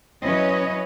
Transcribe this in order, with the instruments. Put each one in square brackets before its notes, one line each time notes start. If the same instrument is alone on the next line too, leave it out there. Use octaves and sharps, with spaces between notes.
[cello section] F#3 C#4 E4 B4 C#5 D#5